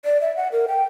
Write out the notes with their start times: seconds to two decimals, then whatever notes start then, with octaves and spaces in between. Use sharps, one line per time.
0.05 D5
0.21 E5
0.36 F#5
0.52 A#4
0.68 G5